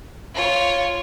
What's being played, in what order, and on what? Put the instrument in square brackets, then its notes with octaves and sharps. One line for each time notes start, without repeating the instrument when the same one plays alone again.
[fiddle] F4 C#5